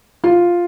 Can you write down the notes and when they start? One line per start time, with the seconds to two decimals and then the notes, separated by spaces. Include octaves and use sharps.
0.24 F4